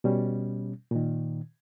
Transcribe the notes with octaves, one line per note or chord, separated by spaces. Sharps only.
B2 G3 C#4
A#2 D#3